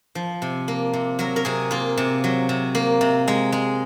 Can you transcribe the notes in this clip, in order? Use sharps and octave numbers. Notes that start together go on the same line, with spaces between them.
F3
C3
A#3
C3
F#3 A#4
A#4
C3 G#4
A#3 F4
C3
F#3
C3
A#3
C3
G#3
G#3